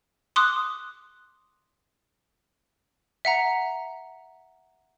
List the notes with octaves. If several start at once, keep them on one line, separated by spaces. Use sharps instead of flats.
C6 D6 D#6 F#6
E5 F#5 A#5